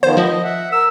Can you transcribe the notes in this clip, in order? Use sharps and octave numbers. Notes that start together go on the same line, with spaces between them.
D#3 F3 B3 C5
F3 D#5
E5 F#5
A#4 E6